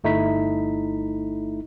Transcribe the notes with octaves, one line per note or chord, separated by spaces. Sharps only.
G1 A3 D#4 E4 B6